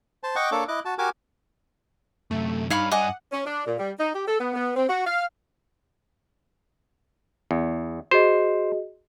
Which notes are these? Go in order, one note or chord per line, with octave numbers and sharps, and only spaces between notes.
C5 A5
D#5 F#5 G5 C#6 D6
A#3 D4 A4 C#5 D6
E4 D#5 D6 F#6
F#4 A5
F#4 G4 A#4 G#5 D6
F#2 C3 A3
G2 D4 D#4 C#5 F5 B5
D#5 F#5 G#5 D6
C#4
D4
A#2
G3
D#4
G4
A4
B3
B3
C4
F#4
F5
E2
F#4 G#4 C5 D#5